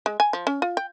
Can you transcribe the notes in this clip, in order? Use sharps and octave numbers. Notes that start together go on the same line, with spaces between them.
G#3
G#5
F3
C#4
F4
G5